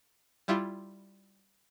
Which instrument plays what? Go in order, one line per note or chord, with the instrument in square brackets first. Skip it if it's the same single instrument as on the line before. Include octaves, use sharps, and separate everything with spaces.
[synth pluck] G3 E4 F4